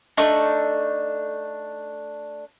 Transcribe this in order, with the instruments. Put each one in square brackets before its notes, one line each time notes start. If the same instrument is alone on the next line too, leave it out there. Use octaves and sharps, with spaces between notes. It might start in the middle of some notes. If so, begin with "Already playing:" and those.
[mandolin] A3 D4 [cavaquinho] D#4 C#6